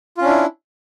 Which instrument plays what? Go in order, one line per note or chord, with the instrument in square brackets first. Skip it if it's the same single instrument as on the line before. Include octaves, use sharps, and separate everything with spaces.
[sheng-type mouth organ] F4
C#4
D4
E4